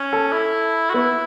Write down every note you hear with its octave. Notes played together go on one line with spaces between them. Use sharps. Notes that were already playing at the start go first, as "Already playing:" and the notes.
Already playing: C#4
A4
E4
F#4
B3 E4